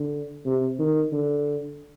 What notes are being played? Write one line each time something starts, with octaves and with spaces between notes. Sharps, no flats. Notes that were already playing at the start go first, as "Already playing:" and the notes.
Already playing: D3
C3
D#3
D3